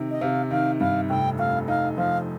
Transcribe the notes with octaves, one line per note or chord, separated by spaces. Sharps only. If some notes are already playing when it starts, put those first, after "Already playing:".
Already playing: C3 D#3
D#5
C3 F5
D#3 F5
G2 F5
F1 G5
F1 F5
D#4 F5
F3 F5